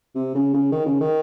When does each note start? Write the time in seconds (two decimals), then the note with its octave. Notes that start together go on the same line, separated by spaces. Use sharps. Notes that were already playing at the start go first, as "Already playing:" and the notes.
0.15 C3
0.34 C#3
0.54 C#3
0.72 D#3
0.86 C#3
1.01 D#3